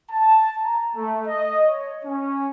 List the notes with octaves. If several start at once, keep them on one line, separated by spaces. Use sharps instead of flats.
A5
A#5
A3
D#5
C#5
C#4